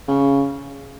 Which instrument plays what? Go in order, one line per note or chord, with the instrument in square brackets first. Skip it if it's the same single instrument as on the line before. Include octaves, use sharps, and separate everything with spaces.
[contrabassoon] C#3